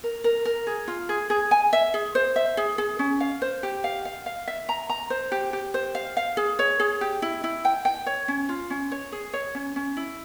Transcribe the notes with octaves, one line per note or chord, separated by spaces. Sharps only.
A#4
A#4
A#4
G#4
F4
G#4
G#4
G#5
E5
G#4
C5
E5
G#4
G#4
C#4
F5
C5
G4
F5
F5
F5
E5
A#5
A#5
C5
G4
G4
C5
F5
F5
G#4
C#5
G#4
G4
E4
E4
G5
G5
C#5
C#4
F4
C#4
C#5
G#4
C#5
C#4
C#4
E4